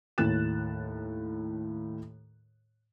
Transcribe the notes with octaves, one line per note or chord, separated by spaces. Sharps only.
D#2 A2 F#6 A6 E7